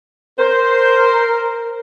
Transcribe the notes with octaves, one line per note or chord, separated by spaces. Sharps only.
A#4 C5